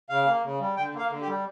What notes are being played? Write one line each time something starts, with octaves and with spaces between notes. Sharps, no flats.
C#3 F5
A#3
C#3
G3
D3 G5
A#3
F5
D3
G4
G3